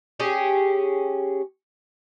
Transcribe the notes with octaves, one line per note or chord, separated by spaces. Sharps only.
C#4 G4 G#4